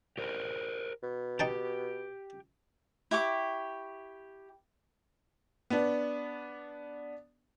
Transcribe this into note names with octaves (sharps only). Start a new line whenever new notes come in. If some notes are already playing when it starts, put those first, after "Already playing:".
G4 A#4 C5
B2
D#4 G4 G5 A5
E4 G4 C#6 D6
B3 D4